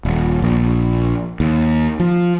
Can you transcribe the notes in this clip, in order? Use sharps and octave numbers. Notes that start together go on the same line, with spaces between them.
D#1
A#1
D#2
F3